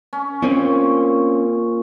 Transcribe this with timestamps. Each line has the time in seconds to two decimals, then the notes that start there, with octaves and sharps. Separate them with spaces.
0.13 C#4
0.42 A#2 C4 C#4